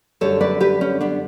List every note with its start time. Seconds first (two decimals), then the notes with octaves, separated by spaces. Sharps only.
0.21 F#2 D3 G3 A4 C#5
0.41 B4 D5
0.61 G4 B4
0.81 C#4
1.01 B3 D4